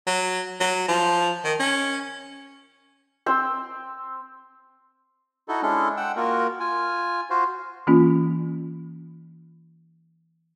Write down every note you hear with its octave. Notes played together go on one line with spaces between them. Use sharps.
F#3
F#3
F3
D#3
C#4
C4 E6
D#4 E4 F#4 A4
G#3 C#4 D4 E4 A4
F#5 G5 E6
A#3 F4 F#4 A#4
F4 G#5
F4 F#4 C5
E3 A#3 C#4 F4